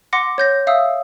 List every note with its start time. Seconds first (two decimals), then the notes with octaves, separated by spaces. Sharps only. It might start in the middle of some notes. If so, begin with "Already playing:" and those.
0.13 F#5 C6 D6 A#6 C#7
0.38 C#5 G6 A#6
0.67 E5 F5 D#6 E6